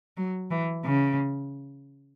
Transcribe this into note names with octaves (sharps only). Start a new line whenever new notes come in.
F#3
E3
C#3